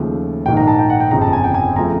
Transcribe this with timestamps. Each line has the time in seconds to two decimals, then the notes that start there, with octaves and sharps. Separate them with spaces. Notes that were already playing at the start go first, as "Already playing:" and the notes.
Already playing: D#2 C#3 F3 A3
0.46 A#1 G#2 D#3 G5
0.57 A#5
0.68 A5
0.79 G5
0.90 F#5
1.00 G5
1.11 G1 F2 C#3 A#5
1.22 A5
1.33 G#5
1.44 G5
1.54 G#5
1.76 C#3 F3 A3 C4 A#5